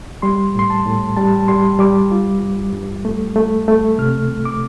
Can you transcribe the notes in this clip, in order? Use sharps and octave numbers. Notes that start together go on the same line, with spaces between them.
G3 C6
A2 C6
A5
A2
G3 A5
G3 C6
G3 D6
F4
G2
G2
A3
A3
A3
C3 F6
C2
D6